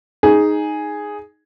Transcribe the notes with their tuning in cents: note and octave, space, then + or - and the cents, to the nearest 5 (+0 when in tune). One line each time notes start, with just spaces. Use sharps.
D#4 +0 G#4 +0